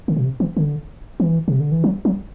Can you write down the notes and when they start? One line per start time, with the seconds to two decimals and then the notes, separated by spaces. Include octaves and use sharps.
0.08 D3
0.17 B2
0.24 C3
0.40 E3
0.57 D3
1.20 E3
1.48 C3
1.60 D3
1.72 E3
1.84 F#3
2.05 F#3